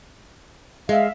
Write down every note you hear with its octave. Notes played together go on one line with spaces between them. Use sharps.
G#3 E5 F5